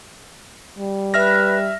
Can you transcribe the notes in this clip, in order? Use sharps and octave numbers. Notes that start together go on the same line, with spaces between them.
G3
B4 E5 F6 A#6